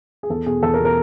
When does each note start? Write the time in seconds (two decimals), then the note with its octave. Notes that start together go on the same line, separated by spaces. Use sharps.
0.23 G#4
0.30 E2 A4
0.46 B2 G#4
0.63 E2 A4
0.74 A#4
0.79 B2
0.85 A#4